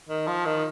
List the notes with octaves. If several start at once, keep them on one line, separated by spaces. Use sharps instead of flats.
D#3
F3
D#3